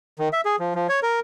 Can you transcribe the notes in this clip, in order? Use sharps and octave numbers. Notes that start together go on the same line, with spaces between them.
D#3
E5
G#4
F3
F3
C#5
A#4